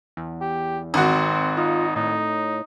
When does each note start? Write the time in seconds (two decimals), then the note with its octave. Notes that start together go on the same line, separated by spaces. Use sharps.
0.17 E2
0.41 G4
0.94 G#1 C4 F#4
1.57 D#4 F4
1.96 A2 D#4